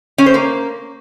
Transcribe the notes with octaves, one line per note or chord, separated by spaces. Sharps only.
C#4
C5
A#3